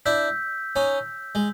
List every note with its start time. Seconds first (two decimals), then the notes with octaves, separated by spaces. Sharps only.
0.06 D4 E4 E6 G6 B6
0.76 C#4 D#4
1.35 G#3